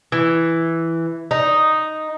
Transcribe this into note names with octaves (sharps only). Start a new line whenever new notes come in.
E3
D#4